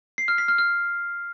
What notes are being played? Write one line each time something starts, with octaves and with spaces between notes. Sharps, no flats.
C7
F6
B6
F6
F6